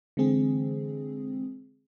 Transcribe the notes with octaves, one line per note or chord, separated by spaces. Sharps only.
D3 E3 G#3 C4 G#4